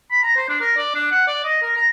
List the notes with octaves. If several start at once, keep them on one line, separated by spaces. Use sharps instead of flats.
B5
A#5
C5
D4
A#4
D5
D4
F#5
D5
D#5
A#4
A#5